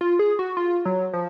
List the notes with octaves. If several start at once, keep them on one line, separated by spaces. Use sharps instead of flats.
F4
G#4
F#4
F4
F#3
F3